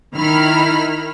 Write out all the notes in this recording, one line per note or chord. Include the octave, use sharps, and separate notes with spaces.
D#3 E4 A#4 B5 F6